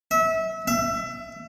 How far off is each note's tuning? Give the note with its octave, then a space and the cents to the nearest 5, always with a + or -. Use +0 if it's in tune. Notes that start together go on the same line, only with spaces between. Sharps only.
E5 -25
E5 +25